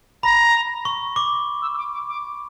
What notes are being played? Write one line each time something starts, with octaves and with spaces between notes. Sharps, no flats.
A#5 B5
C#6
D6
E6
E6
D6
D6
D6